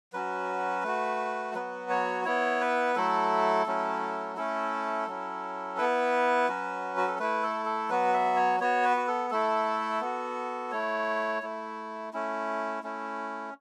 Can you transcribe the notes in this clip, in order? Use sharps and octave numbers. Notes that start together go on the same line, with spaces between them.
F#3 C#4 F#4 B4
A3 F#4
F#3 B3 F#4 B4
C#5
B3 E4 C#5
B4
F#3 A3 E4 A4
F#3 A3 C#4 E4
A3 C#4 E4 A4
F#3 C#4 E4
B3 E4 B4
F#3 C#4 F#4
F#4
A4
A3 E4 B4
A4
A4
F#3 B3 F#4 B4
E5
C#5
B3 F#4 C#5
B4
F#4
A4
A3 E4 A4
B3 F#4
A3 E4 C#5
A3 E4
A3 C#4 E4
A3 C#4 E4